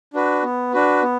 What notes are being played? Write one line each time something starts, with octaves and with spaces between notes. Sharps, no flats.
D4 F#4 B4
B3
D4 F#4 B4
B3